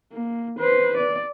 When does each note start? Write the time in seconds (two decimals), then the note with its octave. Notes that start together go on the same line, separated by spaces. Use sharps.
0.12 A#3
0.59 B4 C5
0.97 D5